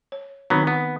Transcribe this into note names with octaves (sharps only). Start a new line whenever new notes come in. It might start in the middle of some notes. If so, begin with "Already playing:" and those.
C#5
D#3 F#3 B3 C4 D#4
B3